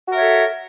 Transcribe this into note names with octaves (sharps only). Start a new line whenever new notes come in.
F#4 A4 A#4 C#5 E5